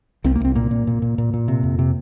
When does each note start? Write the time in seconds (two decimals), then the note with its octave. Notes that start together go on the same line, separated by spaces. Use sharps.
0.24 C2 C4
0.35 A#3
0.40 C2 C4
0.55 A#2 A#3
0.71 A#2
0.87 A#2
1.02 A#2
1.18 A#2
1.34 A#2
1.48 C3
1.63 F2
1.79 C3